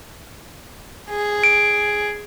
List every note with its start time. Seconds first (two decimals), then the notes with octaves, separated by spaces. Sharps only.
1.10 G#4
1.44 D7